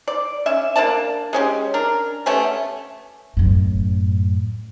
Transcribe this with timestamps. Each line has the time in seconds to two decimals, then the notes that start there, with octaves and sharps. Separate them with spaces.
0.08 D5
0.46 C#4 E5
0.76 A#3 D4 D5 A5
1.33 G#3 C#4 G4
1.74 D4 A#4
2.26 A3 B3 C#4 G4
3.37 F#2 A2